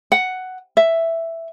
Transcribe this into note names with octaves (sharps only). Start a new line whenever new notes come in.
F#5
E5